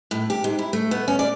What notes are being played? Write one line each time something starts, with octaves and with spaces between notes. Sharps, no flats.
A2
G4
G#2
E4
A3
B3
C#4
D5